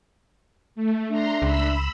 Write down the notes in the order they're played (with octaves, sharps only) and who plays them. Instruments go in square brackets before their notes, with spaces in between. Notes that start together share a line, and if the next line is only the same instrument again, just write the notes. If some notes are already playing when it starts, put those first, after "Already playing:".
[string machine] A3
[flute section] D4 E5 [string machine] A#5 C6
[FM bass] C#2 [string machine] B5 E6